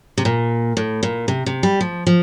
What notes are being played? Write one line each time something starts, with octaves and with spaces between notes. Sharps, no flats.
C3
A#2
A2
A#2
C3
C3
G3
F3
F3